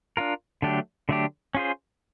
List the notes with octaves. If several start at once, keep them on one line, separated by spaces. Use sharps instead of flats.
D4 F4 A#4
D3 F#3 A3 D4 G4
D3 F#3 A3 D4 G4
C#4 F4 G#4 C5